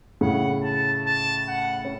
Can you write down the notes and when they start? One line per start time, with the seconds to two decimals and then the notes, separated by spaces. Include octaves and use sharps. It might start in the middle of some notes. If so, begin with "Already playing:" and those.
0.21 A2 C#3 F#5
0.64 A5
1.06 A5
1.48 F#5
1.85 C#4